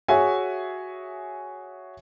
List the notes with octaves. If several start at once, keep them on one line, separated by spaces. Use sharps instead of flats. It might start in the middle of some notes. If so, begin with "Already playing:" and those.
F#4 G#4 C#5 E5 G#5